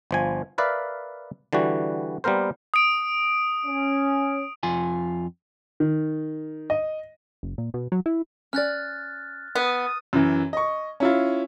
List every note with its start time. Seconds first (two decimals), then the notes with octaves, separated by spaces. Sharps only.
0.11 G1 F3 G#5
0.58 A#4 B4 D5 E5 F5
1.53 D3 E3 G3 F#4
2.24 G3 A#3 B3 A#4 C5
2.74 D#6 D7
3.66 C#4
4.63 F2 F4 G#5
5.80 D#3
6.70 D#5
7.43 F#1
7.58 A#2
7.74 B2
7.92 F#3
8.06 E4
8.53 C#4 D5 F6 F#6 A6
9.55 B3 D#6
10.13 F#2 E3
10.53 D#5 C#6
11.00 C#4 E4 F4